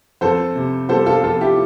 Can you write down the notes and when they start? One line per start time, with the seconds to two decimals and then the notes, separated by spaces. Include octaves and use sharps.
0.21 F2 A4 C5
0.55 C3
0.89 G3 A4 C5
1.06 F4 A4
1.23 F2 F4 A4
1.41 E4 G4